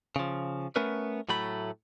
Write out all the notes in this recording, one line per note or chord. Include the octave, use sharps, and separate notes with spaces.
C#3 F3
A3 B3 C#4 A#4 B4
A2 F#3 A3 B5